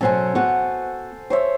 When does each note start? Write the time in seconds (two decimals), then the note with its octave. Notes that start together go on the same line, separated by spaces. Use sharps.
0.01 B2 F#3 C#4 A4 C5 G#5
0.35 B3 F#4
1.30 C5 C#5 E5